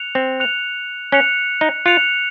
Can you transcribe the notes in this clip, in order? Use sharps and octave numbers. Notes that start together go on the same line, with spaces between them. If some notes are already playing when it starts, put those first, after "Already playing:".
Already playing: F#6 C#7 F7
C4
F#6 C#7 F7
C#4 F#6 C#7 F7
D#4
F4 F#6 C#7 F7